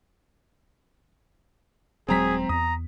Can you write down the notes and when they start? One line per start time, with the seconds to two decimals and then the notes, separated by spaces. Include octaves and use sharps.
2.08 D#1 F#3 G#3 C4 G#4 A#5 B6
2.49 E2 A#5 D#6